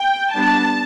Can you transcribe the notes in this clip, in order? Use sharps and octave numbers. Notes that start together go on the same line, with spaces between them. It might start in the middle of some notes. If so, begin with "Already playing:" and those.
Already playing: G5
G3 B3 D4 A5